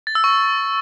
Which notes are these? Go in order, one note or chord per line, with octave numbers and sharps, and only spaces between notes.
A6
E6
C#6